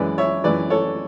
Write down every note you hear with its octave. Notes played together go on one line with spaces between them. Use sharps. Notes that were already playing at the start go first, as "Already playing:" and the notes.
Already playing: F#2 E3 G#3 B4 D5
C#5 E5
F#2 E3 G#3 B4 D5
A4 C#5